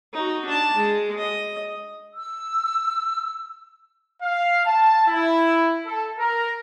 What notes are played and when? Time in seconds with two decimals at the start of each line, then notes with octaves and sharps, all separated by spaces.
0.14 D#4 F#4
0.45 D4 A5
0.76 G#3
1.18 D#5
2.14 E6
4.22 F5
4.65 A5
5.07 E4
5.86 A4
6.19 A#4